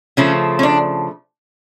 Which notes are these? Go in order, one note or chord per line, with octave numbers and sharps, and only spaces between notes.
C#3 F3 A3 C#4
C#4
D4